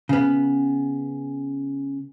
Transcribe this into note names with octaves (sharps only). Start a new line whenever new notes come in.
C#3 B3